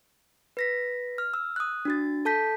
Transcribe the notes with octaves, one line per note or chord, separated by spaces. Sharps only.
B4 A#6 B6
F6
E6
D#6 F#6
D4 F#4 A6
A4 A5 G6 B6